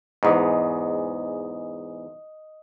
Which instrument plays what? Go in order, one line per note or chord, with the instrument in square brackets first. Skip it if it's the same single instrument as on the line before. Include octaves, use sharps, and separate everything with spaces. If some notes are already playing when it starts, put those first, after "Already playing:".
[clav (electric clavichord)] E2 G#2 [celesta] D#5 D#6